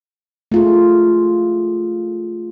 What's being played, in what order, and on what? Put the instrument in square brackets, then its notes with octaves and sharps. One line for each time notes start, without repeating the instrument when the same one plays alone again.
[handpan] A3 F4 G#4